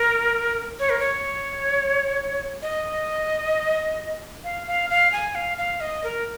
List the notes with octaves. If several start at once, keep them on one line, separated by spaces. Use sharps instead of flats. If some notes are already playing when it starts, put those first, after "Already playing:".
Already playing: A#4
C#5
A#4
C#5
D#5
F5
F5
F5
G#5
F5
F5
D#5
A#4